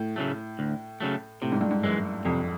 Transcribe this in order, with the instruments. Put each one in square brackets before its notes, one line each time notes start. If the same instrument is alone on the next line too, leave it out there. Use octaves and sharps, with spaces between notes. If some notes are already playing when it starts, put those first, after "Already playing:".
Already playing: [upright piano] A2
[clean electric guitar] C#3 F#3 A3
D2
C#3 F#3 A3
[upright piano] A2 [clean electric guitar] C3
[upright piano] G#2
G2
G#2
[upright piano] F#2 [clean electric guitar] E3 G#3
[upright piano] F2 [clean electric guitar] C3